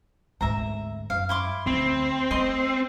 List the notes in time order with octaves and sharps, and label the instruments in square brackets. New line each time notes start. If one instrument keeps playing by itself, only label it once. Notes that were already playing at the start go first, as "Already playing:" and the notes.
[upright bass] G#1 D2 [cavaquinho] E5 A#5
[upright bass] F#2 [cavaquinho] F5
[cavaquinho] E4 C6 D6
[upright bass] D2 [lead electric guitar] C4
[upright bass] A3 [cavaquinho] D#5 C6